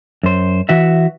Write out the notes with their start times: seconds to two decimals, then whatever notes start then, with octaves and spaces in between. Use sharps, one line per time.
0.23 F#2 C5
0.69 E3 F#4 E5